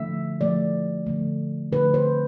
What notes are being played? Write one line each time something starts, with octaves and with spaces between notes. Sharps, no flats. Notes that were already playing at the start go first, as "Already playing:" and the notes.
Already playing: D3 F3 A3 E5
D3 F3 A3 D5
D3 F3 A3
D3 F3 A3 B4
C5